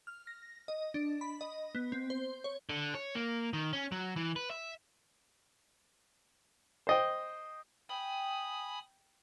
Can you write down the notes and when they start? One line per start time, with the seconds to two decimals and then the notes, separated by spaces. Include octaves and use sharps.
0.07 F6
0.27 A#6
0.68 D#5
0.94 D4
1.21 B5
1.41 D#5
1.75 B3
1.92 C4
2.10 C5
2.44 C#5
2.70 D3
2.95 C#5
3.15 A#3
3.53 D#3
3.73 C#4
3.92 F#3
4.16 E3
4.36 B4
4.51 E5
6.87 C5 D#5 G5
7.89 G5 G#5 B5 D#6